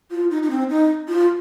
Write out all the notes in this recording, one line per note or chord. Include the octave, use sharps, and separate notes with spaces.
F4
D#4
D#4
C4
D#4
F4